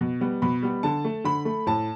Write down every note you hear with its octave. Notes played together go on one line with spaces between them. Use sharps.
B2
G3 B3
B2 B5
G3 B3
D3 A5
A3
D3 B5
A3
A2 A5